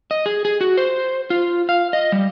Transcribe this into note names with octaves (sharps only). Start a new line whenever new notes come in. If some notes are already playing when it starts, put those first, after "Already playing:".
D#5
G#4
G#4
F#4
C5
F4
F5
D#5
G3